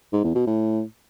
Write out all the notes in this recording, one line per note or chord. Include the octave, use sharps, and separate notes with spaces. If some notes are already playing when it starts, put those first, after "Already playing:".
G#2
E2
B2
A2